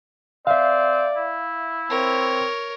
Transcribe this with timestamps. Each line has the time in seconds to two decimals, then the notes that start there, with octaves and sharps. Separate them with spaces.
0.47 C4 D5 E5 F5
1.17 E4
1.90 C4 A#4 C#5